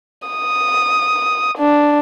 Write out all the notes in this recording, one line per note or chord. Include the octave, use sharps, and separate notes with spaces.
D#6
D4